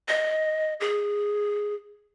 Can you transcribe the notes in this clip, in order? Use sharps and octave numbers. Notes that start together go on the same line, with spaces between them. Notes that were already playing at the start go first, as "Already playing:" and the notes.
D#5
G#4